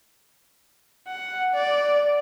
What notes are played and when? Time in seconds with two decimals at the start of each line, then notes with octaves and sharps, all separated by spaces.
1.08 F#5
1.54 D5